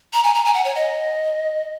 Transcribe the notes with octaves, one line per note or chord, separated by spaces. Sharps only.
A#5
G#5
A#5
G#5
F#5
C#5
D#5